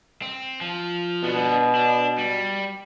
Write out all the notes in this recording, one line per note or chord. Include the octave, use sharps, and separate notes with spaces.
C4
F3
B2 B3 D4
D4
G3